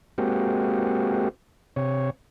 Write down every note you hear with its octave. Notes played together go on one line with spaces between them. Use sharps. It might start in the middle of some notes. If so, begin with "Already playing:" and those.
G#3 A#3 C4 F#4 G4
C3 C#5